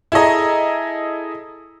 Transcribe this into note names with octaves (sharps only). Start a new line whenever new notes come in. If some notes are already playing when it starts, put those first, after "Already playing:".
E4 G#4 A4 D#5 A#5